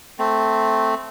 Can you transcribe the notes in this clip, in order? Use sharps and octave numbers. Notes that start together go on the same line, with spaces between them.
A3 C4